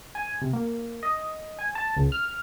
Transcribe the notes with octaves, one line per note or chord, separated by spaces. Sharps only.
G#5
C3
A#3
D#5
G#5
A5
C#2
F6